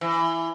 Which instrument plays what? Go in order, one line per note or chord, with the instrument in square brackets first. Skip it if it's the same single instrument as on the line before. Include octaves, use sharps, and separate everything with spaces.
[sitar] E3